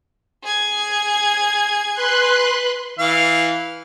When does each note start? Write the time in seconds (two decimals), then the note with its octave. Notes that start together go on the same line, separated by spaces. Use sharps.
0.43 G#4 G#6
1.94 B4 C6 F#6
2.99 E3 F5